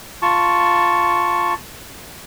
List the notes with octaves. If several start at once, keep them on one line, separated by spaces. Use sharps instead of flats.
F4 A5 C#6